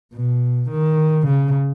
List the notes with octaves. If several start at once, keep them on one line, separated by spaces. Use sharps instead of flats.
B2
D#3
C#3